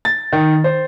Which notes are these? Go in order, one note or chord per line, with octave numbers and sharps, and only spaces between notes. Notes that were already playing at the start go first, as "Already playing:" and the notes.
A6
D#3
C5